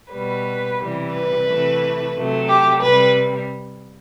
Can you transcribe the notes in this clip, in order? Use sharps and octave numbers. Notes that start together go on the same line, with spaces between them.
B2 G3 B4
C3 E3 G3
B4
C3 E3 A3
C3 F#3 A3
G4
C3 G3 B4